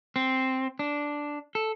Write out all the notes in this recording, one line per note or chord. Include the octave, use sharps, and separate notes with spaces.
C4
D4
A4